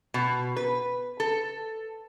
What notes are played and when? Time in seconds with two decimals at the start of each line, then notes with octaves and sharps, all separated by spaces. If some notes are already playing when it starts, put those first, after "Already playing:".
0.14 B2
0.57 B4
1.20 A4